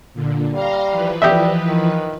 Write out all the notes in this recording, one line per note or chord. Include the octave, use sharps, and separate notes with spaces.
A#2 D3
G3 F5 A#5 C6
E3 F3 B4
G3 G4 D#5 E5
D#3